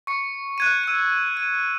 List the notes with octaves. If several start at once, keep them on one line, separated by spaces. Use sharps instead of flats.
C#6 C#7
F#6 G#6 D#7
E6 D#7
D#7